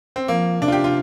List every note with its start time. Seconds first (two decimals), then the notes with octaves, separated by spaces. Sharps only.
0.16 C4
0.28 F3 A#3
0.61 C3 D4
0.68 F4
0.72 G4
0.84 F4